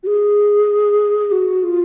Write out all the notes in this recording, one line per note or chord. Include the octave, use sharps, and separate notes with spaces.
F#4
G#4
F#4
F4